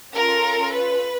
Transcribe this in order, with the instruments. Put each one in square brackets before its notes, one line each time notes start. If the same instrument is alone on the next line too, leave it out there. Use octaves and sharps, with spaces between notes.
[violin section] C#4 F4 A4 A#4
B4